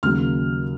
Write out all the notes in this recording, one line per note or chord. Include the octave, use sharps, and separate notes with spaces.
D#2 C#3 F#3 A#3 F6